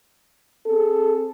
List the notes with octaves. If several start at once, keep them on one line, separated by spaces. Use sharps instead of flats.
C4 G#4 A4